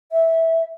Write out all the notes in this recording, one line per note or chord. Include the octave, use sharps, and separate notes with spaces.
E5